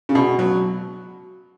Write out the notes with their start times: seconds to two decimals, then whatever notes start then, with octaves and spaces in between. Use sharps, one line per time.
0.09 C#3
0.15 B2
0.39 F#3